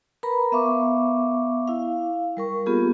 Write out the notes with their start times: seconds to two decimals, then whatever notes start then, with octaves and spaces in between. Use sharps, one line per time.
0.23 A#4 B4 A#5 B5
0.52 B3 E5 F5 C#6 D6
1.68 E4 F5
2.37 G3 A#4 C#6
2.66 A#3 B3 F4 G4 G#4